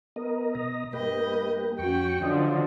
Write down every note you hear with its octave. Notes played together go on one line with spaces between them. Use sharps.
B3 A#4 D#5
B2 D#5 A#5
G2 A#3 G4 B4 D#5
F2 C#4 F#4 G5 C#6
D3 F3 F#3 D#5